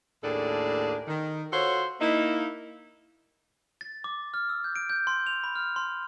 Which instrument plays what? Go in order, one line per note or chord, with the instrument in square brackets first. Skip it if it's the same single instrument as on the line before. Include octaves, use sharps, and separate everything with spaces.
[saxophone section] D#2 A2 A#3 D4 G#4 A4
D#3
F4 F#4 A4 C5 C#5
A#3 D#4 E4
[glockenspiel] A6
D6
F6
E6
G6
D7
G6
C6
F7
B5
F6
C6